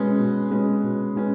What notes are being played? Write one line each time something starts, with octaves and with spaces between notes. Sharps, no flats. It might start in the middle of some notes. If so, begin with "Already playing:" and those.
Already playing: B2 G#3 C#4 B4
B2
G#3 C#4 B4
B2
G#3 C#4 B4